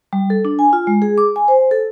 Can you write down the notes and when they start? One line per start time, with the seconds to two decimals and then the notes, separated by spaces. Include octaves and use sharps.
0.13 G3
0.30 A4
0.45 D4
0.59 G#5
0.73 F4
0.87 G#3
1.02 G#4
1.18 D6
1.36 G#5
1.48 C5
1.71 A4